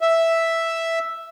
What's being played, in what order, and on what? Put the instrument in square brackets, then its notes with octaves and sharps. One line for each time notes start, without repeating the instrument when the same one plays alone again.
[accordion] E5